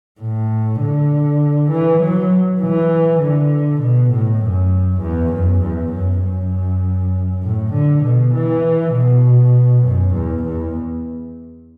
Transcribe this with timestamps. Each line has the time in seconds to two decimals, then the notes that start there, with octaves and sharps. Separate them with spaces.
0.21 A2
0.81 D3
1.72 E3
2.01 F#3
2.61 E3
3.22 D3
3.82 B2
4.12 A2
4.43 F#2
5.02 E2
5.32 F#2
5.63 E2
5.93 F#2
6.23 F#2
7.44 A2
7.73 D3
8.04 B2
8.34 E3
8.94 B2
9.85 F#2
10.14 E2
10.44 E2